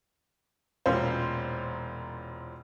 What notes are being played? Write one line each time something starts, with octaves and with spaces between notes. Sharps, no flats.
E1 A#2 C#4 C5